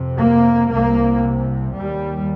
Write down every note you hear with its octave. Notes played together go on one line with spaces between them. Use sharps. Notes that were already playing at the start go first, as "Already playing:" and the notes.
Already playing: F2 C3
A#3
C2 C3 A#3
D#2 G3